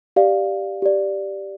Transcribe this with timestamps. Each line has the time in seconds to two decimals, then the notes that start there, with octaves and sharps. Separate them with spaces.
0.16 G4 D5 F5
0.82 G4 D5